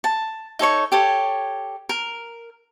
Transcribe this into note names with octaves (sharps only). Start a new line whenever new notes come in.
A5
D#4 A4 C#5 C#6
G4 A4 C#5
A#4